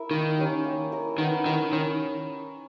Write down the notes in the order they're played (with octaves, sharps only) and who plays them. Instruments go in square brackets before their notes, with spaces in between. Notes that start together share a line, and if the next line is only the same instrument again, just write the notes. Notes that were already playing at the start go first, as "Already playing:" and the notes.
Already playing: [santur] E4 A#4 E5
[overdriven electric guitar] D#3 [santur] A#3
[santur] C#4 G4
A#3
E4 A#4
[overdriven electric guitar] D#3 [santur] B3
[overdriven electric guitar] D#3 [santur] E4 A#4
[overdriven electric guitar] D#3 [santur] C#4